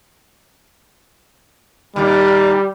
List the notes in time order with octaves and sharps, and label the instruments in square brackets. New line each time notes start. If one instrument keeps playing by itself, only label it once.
[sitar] D#2 A#2 [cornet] G3